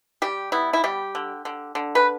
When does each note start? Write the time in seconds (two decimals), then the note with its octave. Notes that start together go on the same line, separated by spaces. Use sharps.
0.22 G3 G4
0.52 B3 E4
0.73 E4
0.84 G3 G4
1.15 D3
1.45 D3
1.75 D3
1.95 B4